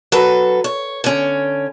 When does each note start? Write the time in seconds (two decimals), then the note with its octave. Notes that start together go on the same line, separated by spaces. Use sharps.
0.12 F#3 A4 B4
0.64 C#5
1.04 D3 C#4